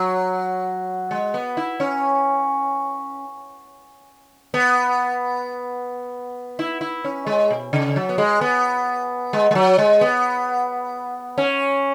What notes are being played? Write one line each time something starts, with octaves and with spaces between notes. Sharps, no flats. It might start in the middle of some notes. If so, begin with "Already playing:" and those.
Already playing: F#3
G#3
B3
E4
C#4
B3
E4
E4
C#4
G#3
B2
C#3
F#3
B3
G#3
B3
G#3
G#3
F#3
G#3
B3
C#4